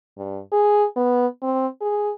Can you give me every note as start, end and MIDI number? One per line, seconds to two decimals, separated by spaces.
0.17 0.39 43
0.52 0.85 68
0.96 1.26 59
1.42 1.67 60
1.81 2.11 68